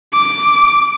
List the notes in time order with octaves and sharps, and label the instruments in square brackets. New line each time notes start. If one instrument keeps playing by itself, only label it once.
[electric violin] D6